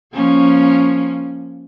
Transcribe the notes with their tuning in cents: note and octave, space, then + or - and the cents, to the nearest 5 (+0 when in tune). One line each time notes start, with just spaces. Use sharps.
F3 +0 A#3 +20 C#4 +0